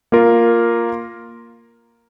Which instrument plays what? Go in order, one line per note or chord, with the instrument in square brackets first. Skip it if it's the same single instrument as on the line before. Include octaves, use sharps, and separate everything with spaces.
[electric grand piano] A#3 F4 A#4